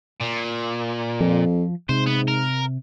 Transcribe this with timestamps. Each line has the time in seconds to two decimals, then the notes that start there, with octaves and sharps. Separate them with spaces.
0.20 A#2
1.20 F2 F3
1.89 G#2 C3 C5
2.07 B3
2.28 A#4